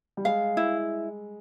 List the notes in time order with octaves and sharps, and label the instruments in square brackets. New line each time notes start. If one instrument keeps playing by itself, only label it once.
[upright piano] G3
[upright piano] G#3 [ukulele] F5
[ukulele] E4